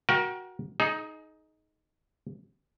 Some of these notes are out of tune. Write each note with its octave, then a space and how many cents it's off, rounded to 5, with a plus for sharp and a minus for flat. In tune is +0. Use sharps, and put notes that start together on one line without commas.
F#4 +0 A#4 +25 G5 +0
D#4 +5 G#4 +35